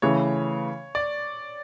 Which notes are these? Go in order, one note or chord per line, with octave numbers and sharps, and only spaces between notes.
C#3 E3 A3 C#5
D5